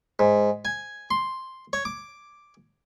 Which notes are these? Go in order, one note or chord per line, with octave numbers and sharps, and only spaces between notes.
G#2
G#5
C6
C#5
D6